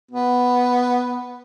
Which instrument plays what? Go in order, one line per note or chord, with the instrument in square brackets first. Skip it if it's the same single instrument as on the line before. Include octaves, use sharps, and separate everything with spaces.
[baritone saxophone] B3